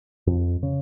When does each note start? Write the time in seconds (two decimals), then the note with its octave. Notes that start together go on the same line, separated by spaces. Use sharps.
0.27 F2
0.63 C#3